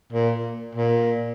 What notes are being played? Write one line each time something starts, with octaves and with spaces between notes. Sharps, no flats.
A#2
A#2